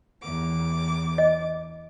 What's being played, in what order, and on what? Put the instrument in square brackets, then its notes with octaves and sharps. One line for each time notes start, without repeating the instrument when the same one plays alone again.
[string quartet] E2 D6
[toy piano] D#5